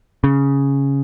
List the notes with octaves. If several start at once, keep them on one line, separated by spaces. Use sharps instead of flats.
C#3